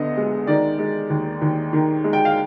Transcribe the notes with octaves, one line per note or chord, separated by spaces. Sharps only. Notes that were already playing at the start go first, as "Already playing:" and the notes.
Already playing: D2 D3 B3 D#5
G#3
D#3 D5
G#3
D#2
D#2
D#3
G#3
G5
F5